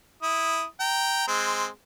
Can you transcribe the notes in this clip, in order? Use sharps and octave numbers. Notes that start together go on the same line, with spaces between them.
E4 D#6
G5 A#5
G#3 C4